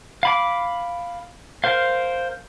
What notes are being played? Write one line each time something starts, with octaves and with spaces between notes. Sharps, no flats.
F5 B5 D6
A#4 C5 F5